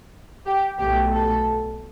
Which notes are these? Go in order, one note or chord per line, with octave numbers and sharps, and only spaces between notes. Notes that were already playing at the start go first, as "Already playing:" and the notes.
G4
B1 B2 A3 G4
A4